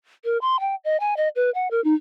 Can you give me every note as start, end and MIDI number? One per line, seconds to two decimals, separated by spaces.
0.24 0.38 70
0.41 0.60 84
0.60 0.75 79
0.84 0.97 75
1.00 1.14 80
1.17 1.28 75
1.36 1.50 71
1.54 1.68 78
1.71 1.83 70
1.84 1.94 63